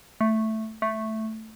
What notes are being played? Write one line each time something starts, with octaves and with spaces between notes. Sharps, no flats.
A3
A3